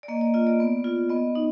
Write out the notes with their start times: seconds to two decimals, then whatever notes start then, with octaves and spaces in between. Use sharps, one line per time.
0.03 D5
0.08 A#3 D#5
0.21 D5
0.34 F4 D#5
0.47 D5
0.60 B3
0.84 F4
1.09 B3 D#5
1.35 D#4